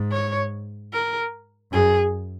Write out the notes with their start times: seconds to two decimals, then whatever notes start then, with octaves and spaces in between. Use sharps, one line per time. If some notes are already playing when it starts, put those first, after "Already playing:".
Already playing: G#2
0.12 C#5
0.93 A#4
1.72 F#2 G#4